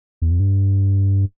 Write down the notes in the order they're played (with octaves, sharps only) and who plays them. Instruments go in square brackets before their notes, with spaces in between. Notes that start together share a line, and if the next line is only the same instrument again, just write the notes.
[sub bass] E2
F2
G2